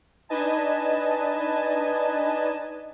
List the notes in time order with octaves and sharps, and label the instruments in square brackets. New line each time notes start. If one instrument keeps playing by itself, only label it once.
[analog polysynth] D4 D#4 B4 D#5 G#5 A5